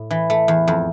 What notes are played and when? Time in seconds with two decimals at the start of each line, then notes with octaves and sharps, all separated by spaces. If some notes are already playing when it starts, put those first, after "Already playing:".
Already playing: A2
0.11 E3
0.30 A3
0.48 E2
0.68 F2